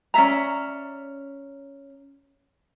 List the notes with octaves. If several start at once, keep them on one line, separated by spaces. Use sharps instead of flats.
C#4 D5 E5 A#5